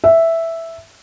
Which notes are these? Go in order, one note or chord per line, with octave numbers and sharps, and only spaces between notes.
E5